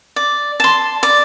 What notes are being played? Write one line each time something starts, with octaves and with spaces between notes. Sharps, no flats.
D5
A5 C6
D5